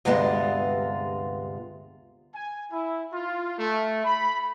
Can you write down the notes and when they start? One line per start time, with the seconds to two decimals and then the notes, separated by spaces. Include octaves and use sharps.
0.05 D2 G2 C3 G#3 B3 F4
2.35 G#5
2.72 E4
3.13 F4
3.59 A3
4.04 B5